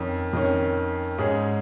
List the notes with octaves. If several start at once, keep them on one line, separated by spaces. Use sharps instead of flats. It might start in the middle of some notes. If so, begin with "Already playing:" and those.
Already playing: F2 D#3 C#4
F2 D#3 C#4
G#2 G#3 C#4 G#4